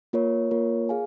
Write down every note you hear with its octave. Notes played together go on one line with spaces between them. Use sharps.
A#3 F4 A#4 C#5
A#3 F4 A#4 C#5
G#4 F5 G#5